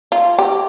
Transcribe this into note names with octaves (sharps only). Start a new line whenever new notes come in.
F4
G4